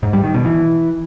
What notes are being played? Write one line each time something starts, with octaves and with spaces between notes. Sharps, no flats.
G#2
G3
D#3
B2
E3